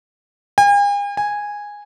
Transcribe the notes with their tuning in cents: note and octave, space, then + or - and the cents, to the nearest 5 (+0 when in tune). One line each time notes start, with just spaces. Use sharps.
G#5 -45
G#5 -10